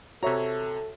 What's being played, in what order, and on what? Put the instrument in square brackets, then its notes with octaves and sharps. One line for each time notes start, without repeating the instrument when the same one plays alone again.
[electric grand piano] C3 A#5 [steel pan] F#4 C#5 E5 [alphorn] A4